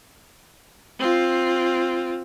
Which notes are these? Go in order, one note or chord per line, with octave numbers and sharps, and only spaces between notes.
C4 F4